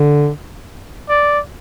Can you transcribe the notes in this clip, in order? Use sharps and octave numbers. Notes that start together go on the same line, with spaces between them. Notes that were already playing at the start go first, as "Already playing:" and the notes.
Already playing: D3
D5